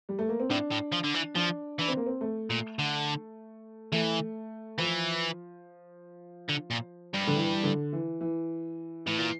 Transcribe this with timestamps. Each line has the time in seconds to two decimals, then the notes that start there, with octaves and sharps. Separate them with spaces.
0.09 G3
0.19 A3
0.29 A#3
0.40 C4
0.50 A2 D4
0.71 A2
0.92 F3
1.04 D3
1.15 E3
1.36 F3 D4
1.79 E3 D4
1.88 C4
1.97 A#3
2.06 C4
2.21 A3
2.50 A#2
2.79 D3
3.92 E3 A3
4.78 E3 F3
6.49 D3
6.71 A#2
7.14 G2
7.27 D3
7.35 E3
7.64 D3
7.93 E3
8.21 E3
9.06 A2 E3
9.18 A#2